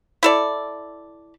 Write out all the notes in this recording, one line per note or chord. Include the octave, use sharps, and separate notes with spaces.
E4 A4 D5